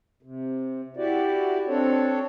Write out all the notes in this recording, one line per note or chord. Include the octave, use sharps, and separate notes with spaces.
C3
E4 F#4 G4 D5
C4 D4 A4 C#5